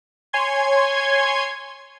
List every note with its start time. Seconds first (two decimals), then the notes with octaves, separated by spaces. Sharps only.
0.33 C#5 G#5 C6 G#6